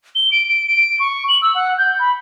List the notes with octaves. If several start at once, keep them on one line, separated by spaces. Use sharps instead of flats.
G7
D7
D7
D7
C#6
F#7
E6
F#5
G6
B5